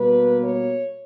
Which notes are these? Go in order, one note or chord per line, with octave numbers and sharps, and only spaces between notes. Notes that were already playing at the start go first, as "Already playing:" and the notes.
Already playing: B2 G3 A#3 B4
C#5